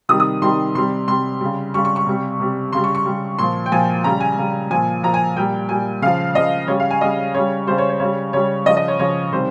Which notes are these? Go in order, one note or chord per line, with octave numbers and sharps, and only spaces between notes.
C3 D#3 G3 D#6
D#6
C3 D#3 G3 C6
C3 G3 C6
C3 G3 C6
C#3 G3
C#3 G3 C#6
C#6
C#6
C3 G3
C3 G3
C#3 G3 C6
C#6
C#6
C#3 G3
A#2 F3 C6
G5
A#2 F3 G#5
C#3 G3 A#5
G#5
C#3 G3
A#2 F3 G#5
A#2 F3 A#5
G#5
A#2 G3 G5
A#2 G3 G#5
C#3 F3 F5
C#3 F3 D#5
C#3 G3 C#5
F5
G#5
C#3 G3 D#5
C#3 G3 C#5
C#3 G3 C5
C#5
C#5
C#3 G3 C#5
C#3 G3 C#5
C#3 F3 D#5
D#5
C#5
C#3 F3 C#5
C3 D#3 G3 C5